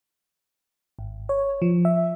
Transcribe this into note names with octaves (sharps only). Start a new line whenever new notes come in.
G#1
C#5
F3
E5